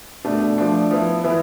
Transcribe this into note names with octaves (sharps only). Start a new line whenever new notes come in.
B2 A3 D4
F3 A3 D4
F3 B3 E4
E3 B3 E4